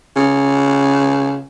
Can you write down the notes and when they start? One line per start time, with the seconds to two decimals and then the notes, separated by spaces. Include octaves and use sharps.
0.16 C#3